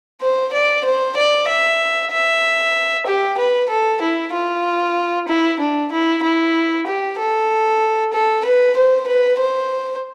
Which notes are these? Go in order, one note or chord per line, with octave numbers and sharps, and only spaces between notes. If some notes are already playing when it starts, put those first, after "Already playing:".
C5
D5
C5
D5
E5
E5
G4
B4
A4
E4
F4
E4
D4
E4
E4
G4
A4
A4
B4
C5
B4
C5